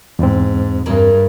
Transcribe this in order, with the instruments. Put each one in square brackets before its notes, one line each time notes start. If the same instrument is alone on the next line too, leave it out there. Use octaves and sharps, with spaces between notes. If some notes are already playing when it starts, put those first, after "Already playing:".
[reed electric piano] E2 C4 [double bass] G#2
[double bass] G2 [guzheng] G#3 A#3